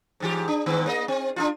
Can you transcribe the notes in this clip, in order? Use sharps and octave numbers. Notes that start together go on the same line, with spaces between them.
G#2 E3 G4
D4
G#2 D#3 B3
A#3 B4 D#5
C4
D4 D#4 F4